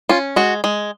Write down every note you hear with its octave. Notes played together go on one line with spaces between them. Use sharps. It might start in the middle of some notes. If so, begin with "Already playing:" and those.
C#4 F4
G#3 F#4
G#3